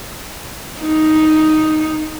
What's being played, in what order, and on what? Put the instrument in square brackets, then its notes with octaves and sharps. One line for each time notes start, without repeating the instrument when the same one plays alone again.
[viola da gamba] D#4